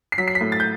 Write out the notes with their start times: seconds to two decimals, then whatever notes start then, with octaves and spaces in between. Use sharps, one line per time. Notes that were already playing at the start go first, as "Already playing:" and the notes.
0.12 C7
0.18 F#3 B6
0.28 C7
0.35 B6
0.41 A2
0.52 A6
0.60 G6